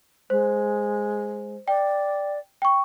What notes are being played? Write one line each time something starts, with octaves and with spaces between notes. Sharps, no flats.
G#3 C5
D5 G5
G5 C#6